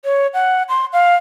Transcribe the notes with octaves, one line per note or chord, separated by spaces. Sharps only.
C#5
F#5
C6
F5